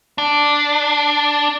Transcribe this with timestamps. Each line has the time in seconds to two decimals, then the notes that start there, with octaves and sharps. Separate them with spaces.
0.18 D4